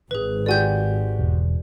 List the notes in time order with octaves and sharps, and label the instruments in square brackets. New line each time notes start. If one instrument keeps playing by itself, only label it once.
[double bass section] G#1 [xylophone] G#4 B4
[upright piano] G#3 F#4 G4 [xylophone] D5 G#5 G6
[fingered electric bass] E1